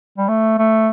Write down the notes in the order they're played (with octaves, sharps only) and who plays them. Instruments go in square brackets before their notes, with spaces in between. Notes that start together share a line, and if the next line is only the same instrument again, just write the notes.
[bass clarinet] G3
A3
A3